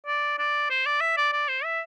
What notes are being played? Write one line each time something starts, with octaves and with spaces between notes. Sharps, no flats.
D5
D5
C5
D5
E5
D5
D5
C5
E5